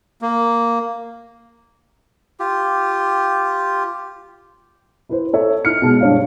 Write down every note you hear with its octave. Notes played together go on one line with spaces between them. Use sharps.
A#3
F4 G4
E4 B4 C5
A4 C#5 E5
D#4 F6 C#7
B2 G#3 A5
G2 C#5 F5